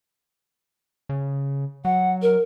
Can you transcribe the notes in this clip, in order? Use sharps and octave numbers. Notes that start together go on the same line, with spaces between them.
C#3
F#3 F#5
A#4